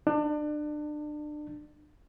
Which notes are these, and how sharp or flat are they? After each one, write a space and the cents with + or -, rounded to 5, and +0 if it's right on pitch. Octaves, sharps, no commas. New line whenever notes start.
D4 +30